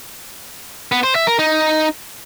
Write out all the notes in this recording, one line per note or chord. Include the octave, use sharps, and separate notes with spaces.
B3
C5
E5
A#4
D#4